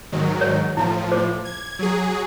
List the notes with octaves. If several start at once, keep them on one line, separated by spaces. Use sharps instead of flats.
G#2 D#3 F#3
C#5
A2 F3 E4
C5 D6
G#6
F#3 G#4